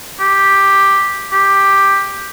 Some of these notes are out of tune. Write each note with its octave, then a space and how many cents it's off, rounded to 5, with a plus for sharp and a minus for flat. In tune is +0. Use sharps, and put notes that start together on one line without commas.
G4 +5
G4 +5